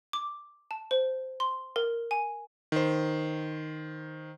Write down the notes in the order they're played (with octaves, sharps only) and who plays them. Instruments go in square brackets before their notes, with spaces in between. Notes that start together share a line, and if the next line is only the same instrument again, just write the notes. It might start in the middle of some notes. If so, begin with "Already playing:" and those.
[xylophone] D6
A5
C5
C6
A#4
G#5
[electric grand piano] D#3 C5